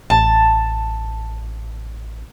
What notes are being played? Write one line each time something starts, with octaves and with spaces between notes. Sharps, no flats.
A1 A5